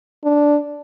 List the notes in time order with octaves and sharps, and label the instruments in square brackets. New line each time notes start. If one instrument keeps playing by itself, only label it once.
[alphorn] D4